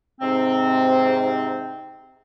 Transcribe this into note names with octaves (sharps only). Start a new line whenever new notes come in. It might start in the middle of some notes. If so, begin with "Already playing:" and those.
G#2 C3 C4